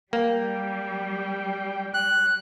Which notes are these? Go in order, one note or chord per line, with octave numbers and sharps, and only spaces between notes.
G3 A#3 G5
F#6